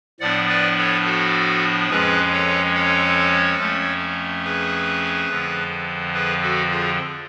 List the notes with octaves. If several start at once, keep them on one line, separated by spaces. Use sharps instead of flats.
A2 F3 B3 D4 D5 F#5
B4 D5
A4 C#5
F#4 A4
F2 F3 G#3 C#4 G#4 B4
A4 C#5
A4 C#5
F2 F3 A3 C#4
G#4 B4
F2 D3 F3
G#4 B4
F#4 A4
F4 G#4